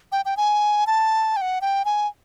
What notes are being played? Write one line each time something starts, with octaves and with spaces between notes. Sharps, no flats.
G5
G5
G#5
A5
G5
F#5
G5
G#5